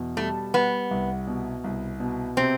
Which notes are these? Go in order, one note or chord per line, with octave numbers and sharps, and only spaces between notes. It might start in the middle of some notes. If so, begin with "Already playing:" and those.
Already playing: E2 B2
G3 A3
G3 B3
C2
B2
C2
B2
C3 C4